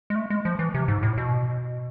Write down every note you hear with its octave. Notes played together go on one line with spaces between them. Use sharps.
G#3
A3
G#3
F3
E3
C3
G#2
A2
B2